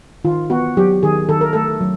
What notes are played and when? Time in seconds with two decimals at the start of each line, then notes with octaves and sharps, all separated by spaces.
0.24 D#3 F4
0.50 B3 F#4
0.77 F#3 G4
1.03 D#3 G#4
1.29 D#3 A4
1.41 A#4
1.53 A3 A4
1.80 F#3